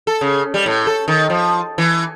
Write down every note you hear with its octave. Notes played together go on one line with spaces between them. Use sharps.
A4
C#3
G3
A2
A4
D#3
F3
E3